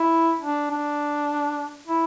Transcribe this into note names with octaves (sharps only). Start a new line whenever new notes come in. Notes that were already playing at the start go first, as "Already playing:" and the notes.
Already playing: E4
D4
D4
E4